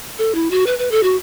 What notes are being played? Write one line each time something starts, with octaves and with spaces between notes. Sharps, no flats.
A4
E4
F#4
B4
B4
A4
F#4